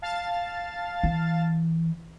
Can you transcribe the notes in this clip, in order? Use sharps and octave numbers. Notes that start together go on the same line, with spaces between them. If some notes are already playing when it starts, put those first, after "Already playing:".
F5 A5 A6
E3